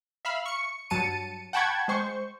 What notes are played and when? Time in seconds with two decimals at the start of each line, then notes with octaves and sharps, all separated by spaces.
0.25 E5 F5 B5
0.46 C#6 C#7
0.90 G2 F#3 A5 C#7 D#7
1.53 F#5 G5 A5 B5 C#6 G#6
1.88 G#3 C5 C#6